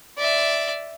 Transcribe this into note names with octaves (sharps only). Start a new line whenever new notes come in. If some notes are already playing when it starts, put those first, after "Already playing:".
D5 E5